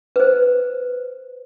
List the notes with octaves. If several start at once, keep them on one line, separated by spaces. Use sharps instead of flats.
B4 C5